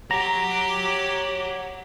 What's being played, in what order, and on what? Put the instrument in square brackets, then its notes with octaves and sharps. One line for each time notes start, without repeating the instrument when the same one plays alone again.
[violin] G4 [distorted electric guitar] C#5 F#5 [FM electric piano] A#5